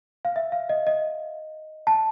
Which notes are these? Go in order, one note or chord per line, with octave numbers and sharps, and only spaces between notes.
F5
E5
F5
D#5
D#5
A5